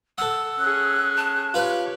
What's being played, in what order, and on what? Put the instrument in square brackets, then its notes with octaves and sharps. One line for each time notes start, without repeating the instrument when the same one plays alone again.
[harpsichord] A4 F#5 [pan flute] E6
[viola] C#4 G#4 [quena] F#6
[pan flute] A5
[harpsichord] F4 B4 F5 [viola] G4 C#5